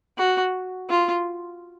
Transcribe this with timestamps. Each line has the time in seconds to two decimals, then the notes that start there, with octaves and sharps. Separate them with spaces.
0.18 F#4
0.90 F4